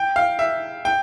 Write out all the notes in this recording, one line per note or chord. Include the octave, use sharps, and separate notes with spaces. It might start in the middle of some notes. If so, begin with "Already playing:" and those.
Already playing: G5
F5
E5
G5